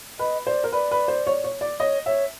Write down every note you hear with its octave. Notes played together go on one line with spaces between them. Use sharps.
B4 D#5
C5 D5
A#4
B4 D5
B4
C5
C#5
C#5
D5
C#5 D#5
C#5 E5